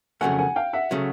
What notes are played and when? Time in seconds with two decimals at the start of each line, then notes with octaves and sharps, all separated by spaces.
0.21 F2 C#3 F#3 A3 F#5 G#5
0.39 F#5 G#5
0.56 F5 G5
0.73 E5 F#5
0.91 C#3 F#3 A3